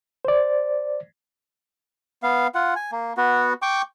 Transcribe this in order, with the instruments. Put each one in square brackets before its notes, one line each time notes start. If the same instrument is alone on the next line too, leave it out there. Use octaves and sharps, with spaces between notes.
[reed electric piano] C5 D5
[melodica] B3 F5
F4 F#5
G#5
A#3
B3 F#4
G5 C#6 D6